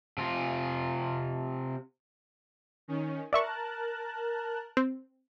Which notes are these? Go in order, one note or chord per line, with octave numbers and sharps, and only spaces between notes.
C3 F4
D#3 C#4
A#4 D5 E5 A5 C#6 F#6
C4